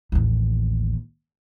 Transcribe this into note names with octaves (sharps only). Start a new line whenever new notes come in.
A1 D#2